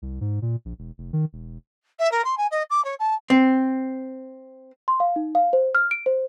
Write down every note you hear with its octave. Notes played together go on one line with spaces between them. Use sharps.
C2
G#2
A#2
A#1
E1
F1
D#3
E1
E5
A#4
C6
G#5
D#5
D6
C#5
A5
C4
C6
F5
D#4
F5
C5
F6
D7
C5